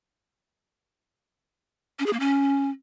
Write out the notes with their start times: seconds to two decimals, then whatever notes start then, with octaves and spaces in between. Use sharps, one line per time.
1.99 C#4
2.06 G#4
2.13 A#3
2.20 C#4